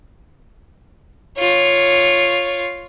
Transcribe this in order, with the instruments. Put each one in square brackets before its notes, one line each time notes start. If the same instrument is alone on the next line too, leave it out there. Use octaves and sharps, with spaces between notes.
[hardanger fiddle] F4 C#5